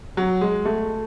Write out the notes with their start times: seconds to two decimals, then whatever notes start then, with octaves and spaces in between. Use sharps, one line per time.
0.17 F#3
0.41 G#3
0.65 A3